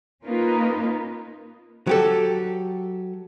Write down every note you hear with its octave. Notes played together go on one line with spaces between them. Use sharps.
A#3 C#4 D#4 F4 A#4 B4
F#3 G4 A4